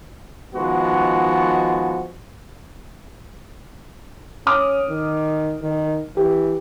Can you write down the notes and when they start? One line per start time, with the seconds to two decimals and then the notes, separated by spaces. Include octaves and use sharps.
0.54 D#3 F3 G#3 B3 F#4
4.47 C#4 D6 D#6 F6
4.89 D#3
5.62 D#3
6.17 E3 G4